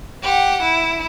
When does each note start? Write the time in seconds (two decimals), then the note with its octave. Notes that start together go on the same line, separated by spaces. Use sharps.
0.23 G4 F#5
0.62 E4